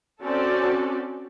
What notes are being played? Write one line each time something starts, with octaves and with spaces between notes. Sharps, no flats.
C4 C#4 F#4 A4 D5